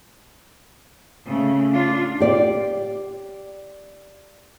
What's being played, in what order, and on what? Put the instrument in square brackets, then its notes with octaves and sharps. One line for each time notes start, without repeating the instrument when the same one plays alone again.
[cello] C#3 A3
D4 F4
[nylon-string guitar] G4 D5